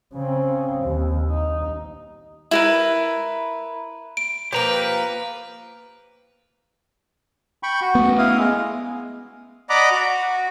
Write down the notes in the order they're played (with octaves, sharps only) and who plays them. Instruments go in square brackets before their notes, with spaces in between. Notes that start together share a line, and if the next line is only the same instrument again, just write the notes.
[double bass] C#3 C4
D#2
D#4
[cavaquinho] E4 A#4 B4
[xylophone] D7
[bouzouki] F3 A#3 [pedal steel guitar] G4 A#5 [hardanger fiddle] B4
[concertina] G5 B5 C#6
F#4
[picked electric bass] A3 B3
[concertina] E4 F5 D#6
G#3
[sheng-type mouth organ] D5 D#5 F#5 A#5 B5 D6
F#4